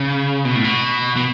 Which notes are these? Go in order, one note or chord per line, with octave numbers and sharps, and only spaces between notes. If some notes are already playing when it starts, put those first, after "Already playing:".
Already playing: C#3
B2
A2
B2
B2